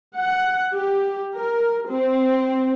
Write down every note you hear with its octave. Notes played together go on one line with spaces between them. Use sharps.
F#5
G4
A#4
C4